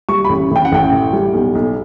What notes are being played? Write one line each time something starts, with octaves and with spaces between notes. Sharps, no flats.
G3 C#6
B5
A1
A1 G5
F#5
A1 G5
A2
G3
B1
B1